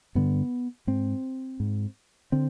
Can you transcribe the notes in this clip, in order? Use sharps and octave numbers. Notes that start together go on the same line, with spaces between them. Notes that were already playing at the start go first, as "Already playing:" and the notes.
G2 D3 B3
G#2 C4
G#2
D3 C4